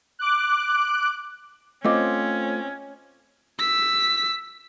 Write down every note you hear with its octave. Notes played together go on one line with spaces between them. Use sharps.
D6 F#6
A3 C4 C#4 F4 C5 D#5 D6
E6 B6